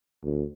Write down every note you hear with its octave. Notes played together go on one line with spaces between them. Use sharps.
D2